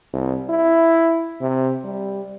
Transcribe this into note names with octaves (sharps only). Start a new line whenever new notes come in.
C2
E4
C3
G3